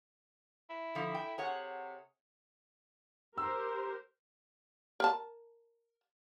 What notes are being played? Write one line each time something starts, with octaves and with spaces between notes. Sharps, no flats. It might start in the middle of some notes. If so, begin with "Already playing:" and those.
E4
D3 F3
G5
C3 G#4 C#5 F#5
G4 A#4 C5 E6
A#4 A5